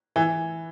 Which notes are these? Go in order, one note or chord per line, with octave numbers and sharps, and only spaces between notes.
E3